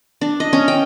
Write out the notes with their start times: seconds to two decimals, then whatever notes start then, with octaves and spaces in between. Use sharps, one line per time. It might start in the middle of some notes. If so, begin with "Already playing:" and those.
0.21 D4
0.40 D#5
0.53 C#4
0.68 G5